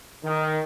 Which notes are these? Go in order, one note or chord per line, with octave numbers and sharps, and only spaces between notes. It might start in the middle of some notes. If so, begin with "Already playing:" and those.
D#3